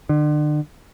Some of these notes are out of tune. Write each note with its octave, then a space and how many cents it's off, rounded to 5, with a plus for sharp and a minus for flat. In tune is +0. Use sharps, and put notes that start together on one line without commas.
D3 +35